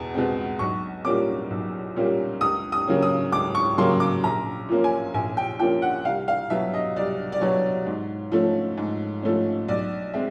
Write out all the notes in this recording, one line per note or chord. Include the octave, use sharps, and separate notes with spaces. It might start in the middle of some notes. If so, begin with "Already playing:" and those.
Already playing: E2 B2
B2 G#3 C4
B1 C#6
A#2 G3 A#3 C#4 D6
B1
A#2 G3 A#3 C#4
C#2 D#6
D#6
C#3 F#3 A#3 C#4
D#6
C#2 D6
C#6
C#3 F#3 A#3 C#4 C6
D6
A#1 A#5
A#2 F3 A#3 C#4
G#5
A#1 G#5
G5
A#2 F3 A#3 C#4 G5
F#5
C2 F5
F5
B2 F#3 E5
D#5
C2 D5
D5
B2 F#3 C#5
G#2
F3 A3 C#4
G#2
F3 A3 C#4
B1 D5
G#3 C4 E5